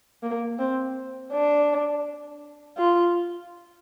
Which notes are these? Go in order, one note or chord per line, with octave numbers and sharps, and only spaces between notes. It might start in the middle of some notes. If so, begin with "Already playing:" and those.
A#3
C4
D4
F4